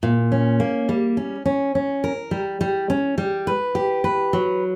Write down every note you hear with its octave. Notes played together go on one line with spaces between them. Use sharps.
A#2
C#4
A#3
G3
C#4
C#4
C#4
A#4
G3
G3
C#4
G3
B4
G4
B4
F#3